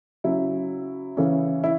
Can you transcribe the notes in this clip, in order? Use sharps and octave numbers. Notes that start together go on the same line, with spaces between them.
C#3 F#3 C#4 E4
C#3 E3 C#4
E4